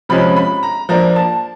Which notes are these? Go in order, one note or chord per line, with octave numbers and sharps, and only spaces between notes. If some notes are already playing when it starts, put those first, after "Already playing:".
C3 F3 G#3 C#4 B5
B5
A#5
F3 A#3 D4 A#5
A5